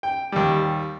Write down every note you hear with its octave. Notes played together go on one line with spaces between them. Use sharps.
G5
D#2 G3